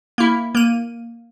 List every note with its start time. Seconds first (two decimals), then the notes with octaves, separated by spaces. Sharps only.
0.18 A#3 E4
0.55 A#3 D#7